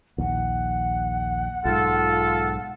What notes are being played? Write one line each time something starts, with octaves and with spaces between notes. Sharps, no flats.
A#1 D#2 F#5
B1 G#2 F4 A4